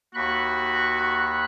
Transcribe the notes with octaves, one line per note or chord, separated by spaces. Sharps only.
D#2 F#4 B5 F#6